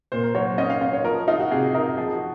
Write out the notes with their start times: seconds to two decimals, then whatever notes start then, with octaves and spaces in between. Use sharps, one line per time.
0.12 A#2 C5
0.23 A#4
0.35 F#3 C#5
0.58 C#4 D#5
0.70 F5
0.81 C#4 D#5
0.93 C#5
1.04 F3 A#4
1.28 D#4 F4
1.39 F#4
1.51 C3 G#4
1.74 D#4 A#4
1.97 F3 G#4
2.13 F#4